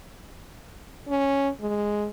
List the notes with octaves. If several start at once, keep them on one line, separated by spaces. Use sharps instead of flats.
C#4
G#3